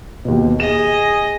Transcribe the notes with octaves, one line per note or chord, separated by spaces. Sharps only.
D#2 B2
G#4 D#5 E7